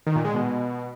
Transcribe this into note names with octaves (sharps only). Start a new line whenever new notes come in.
D#3
A#2
G#3
B2